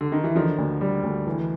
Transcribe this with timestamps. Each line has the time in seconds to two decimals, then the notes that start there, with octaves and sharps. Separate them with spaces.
0.01 D3
0.12 D#3
0.24 E3
0.35 D3 D#3 F3
0.58 D2
0.81 G3
1.04 D2
1.27 E3